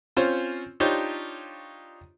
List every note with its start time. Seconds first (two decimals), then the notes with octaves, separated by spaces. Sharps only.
0.17 C4 C#4 F4 C5 C#5
0.80 D4 D#4 F4 G4 C5 C#5